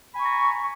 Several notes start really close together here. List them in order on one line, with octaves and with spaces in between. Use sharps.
B5 G#5 C#6 A#5